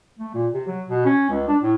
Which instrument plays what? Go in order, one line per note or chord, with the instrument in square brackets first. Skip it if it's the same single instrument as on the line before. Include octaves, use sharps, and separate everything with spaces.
[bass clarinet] A3
A#2
C3
F#3
B2
C#4
C#2
D4
A2